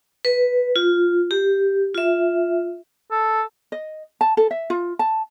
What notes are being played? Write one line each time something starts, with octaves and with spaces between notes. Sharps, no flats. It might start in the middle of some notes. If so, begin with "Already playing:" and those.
B4
F4
G4
F4 E5
A4
D#5
A5
A4
E5
F4
A5